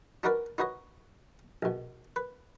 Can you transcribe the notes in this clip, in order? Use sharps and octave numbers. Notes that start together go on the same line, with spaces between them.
D4 D#4 F#4 A#4 B4 D5
D#4 F#4 B4 C#5 D#5
A#1 B2
B4